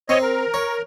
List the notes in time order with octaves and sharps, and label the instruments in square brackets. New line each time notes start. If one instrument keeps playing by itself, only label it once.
[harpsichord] C4 [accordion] C#5 D#5
[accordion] A#4
[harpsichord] C#5